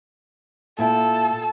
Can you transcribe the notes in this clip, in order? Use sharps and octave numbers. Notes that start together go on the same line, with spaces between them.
A#2 E4 A4 G5